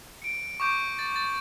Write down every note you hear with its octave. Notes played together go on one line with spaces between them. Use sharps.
C#7 D7
C#6 D6 G6 D7
A6
A6